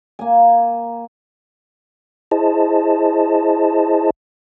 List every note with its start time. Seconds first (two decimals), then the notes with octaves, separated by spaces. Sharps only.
0.19 A#3 G#5
2.31 E4 G#4 C5 D#5 A5